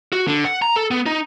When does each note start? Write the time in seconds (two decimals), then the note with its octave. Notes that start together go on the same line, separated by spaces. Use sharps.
0.13 F#4
0.27 D3
0.45 F#5
0.62 A#5
0.76 A4
0.91 B3
1.06 D#4